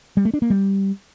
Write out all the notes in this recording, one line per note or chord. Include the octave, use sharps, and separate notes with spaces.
G3
A3
D4
A#3
G3